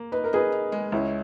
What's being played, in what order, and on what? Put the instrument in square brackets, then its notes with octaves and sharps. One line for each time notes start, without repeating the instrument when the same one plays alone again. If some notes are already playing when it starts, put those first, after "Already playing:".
Already playing: [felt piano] A#3
[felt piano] D#4 [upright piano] B4
[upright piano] A#4
[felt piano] D#4 [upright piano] G#4 B4
[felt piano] D#4
G#3
[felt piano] C#2 [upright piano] C#4 E4